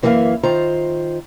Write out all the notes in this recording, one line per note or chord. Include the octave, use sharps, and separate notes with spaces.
F#2 E3 A#3 G#4 E5 F5
D#3 F4 C5 A#5